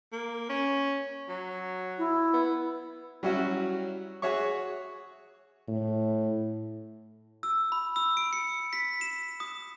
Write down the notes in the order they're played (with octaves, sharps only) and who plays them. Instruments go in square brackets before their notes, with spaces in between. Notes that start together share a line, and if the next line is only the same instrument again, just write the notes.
[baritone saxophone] A#3
C#4
F#3
[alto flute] E4
[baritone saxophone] B3
[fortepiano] F#3 G3 C#4 E4 F#4
F#4 G#4 C#5 E5 C#6
[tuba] A2
[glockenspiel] E6
B5
E6
D7
C#7
B6
E7
D#6